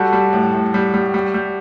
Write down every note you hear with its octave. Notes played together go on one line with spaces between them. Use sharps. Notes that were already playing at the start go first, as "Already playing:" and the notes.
Already playing: G3 F#4 A4
G3
A2
A2
G3
G3
G3
G3